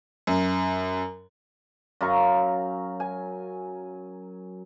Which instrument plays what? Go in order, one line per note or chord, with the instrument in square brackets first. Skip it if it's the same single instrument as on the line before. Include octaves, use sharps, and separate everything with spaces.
[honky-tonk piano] F#2
[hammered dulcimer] F#2 F5 A#5 C#6
G#5